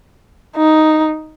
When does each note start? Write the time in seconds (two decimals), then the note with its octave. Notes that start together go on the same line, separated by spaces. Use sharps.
0.56 D#4